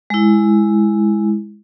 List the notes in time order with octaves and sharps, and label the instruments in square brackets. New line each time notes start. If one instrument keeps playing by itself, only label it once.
[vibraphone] G#3 E4